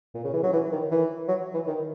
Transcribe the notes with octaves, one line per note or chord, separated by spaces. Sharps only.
A#2
C#3
E3
F#3
E3
D#3
E3
F#3
E3
D#3